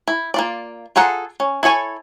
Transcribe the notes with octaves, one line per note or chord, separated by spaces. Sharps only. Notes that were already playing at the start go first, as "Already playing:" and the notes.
E4
A#3 F4 D5
F4 G#4 A4 F#5 A#5
C#4
E4 A4 C#5 G#5